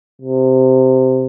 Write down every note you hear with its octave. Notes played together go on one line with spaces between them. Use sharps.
C3